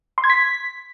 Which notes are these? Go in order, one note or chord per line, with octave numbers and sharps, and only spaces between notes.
C6
G#6
B6